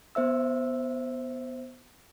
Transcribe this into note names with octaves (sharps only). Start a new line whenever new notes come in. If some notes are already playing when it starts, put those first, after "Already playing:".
B3 C5 E5 E6